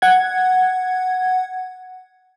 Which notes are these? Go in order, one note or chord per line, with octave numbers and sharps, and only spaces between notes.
F#5 G#6